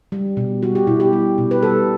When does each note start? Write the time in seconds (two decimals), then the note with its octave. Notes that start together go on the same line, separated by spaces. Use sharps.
0.12 G3
0.37 B2
0.63 G3 F#4
0.75 G4
0.87 B2 E4
1.00 G4
1.13 G3
1.38 B2
1.51 B4
1.63 G3 A4